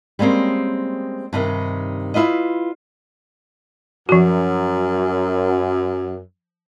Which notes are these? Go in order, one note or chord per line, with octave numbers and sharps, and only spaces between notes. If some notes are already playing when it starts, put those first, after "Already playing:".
G3 G#3 A#3 C4 C#4
G2 C3 D#3
E4 F4 B4 D#5
F#2 F3 F#4